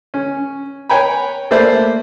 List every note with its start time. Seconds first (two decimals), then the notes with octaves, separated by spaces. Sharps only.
0.14 C#4
0.90 B4 C#5 G5 G#5 A#5 B5
1.51 A3 A#3 B4 C5 D5 E5